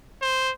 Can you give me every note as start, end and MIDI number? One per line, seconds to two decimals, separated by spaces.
0.21 0.51 72